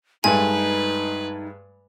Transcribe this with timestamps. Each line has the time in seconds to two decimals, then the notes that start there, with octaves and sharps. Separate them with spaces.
0.24 G2 G#3 A3 D#4 B4 G#5